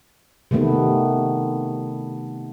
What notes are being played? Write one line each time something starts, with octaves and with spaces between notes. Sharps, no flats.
C3 D#3 A3 B3